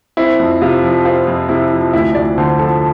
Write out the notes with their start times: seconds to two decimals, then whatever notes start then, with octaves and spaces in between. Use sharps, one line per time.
0.17 C4 E4
0.39 F2
0.62 C3 F4
0.83 F3
1.05 C4 F4
1.27 F2
1.49 C3 E4
1.72 F3
1.93 D2 E4
2.15 D2 D5
2.38 D3 C5
2.59 F3 A4